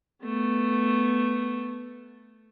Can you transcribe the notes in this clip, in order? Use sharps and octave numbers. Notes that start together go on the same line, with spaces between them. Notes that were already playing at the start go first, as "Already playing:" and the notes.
A3 B3